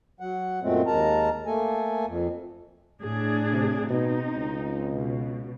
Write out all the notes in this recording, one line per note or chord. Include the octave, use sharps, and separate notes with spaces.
F#3 F#5
F#2 A#2 F#3 G#3 A3 C4
D#2 G#3 A#4 A5 A#5
A3 A#3 A4 G#5
F2
A2 D4 G#4
C3
B2 C4 D#4
C#2
B2